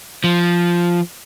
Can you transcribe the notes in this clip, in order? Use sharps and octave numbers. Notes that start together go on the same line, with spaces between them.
F3